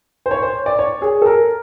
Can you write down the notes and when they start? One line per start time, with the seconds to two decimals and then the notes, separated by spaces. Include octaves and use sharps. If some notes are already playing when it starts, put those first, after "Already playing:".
0.26 C5
0.31 C#5
0.43 C5
0.66 D5
0.79 C#5
1.02 G#4
1.22 A4
1.26 A#4